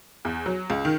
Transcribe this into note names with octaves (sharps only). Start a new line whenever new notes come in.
E2
F#3
C#2
D#3